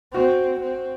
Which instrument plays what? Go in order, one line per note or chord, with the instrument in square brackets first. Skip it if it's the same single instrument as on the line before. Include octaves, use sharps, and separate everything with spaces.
[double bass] C4 [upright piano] F#4
[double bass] C4